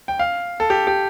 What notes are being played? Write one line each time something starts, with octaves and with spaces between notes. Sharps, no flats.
G5
F5
A4
G4
G4